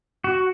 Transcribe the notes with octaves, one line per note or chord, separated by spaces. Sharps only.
F#4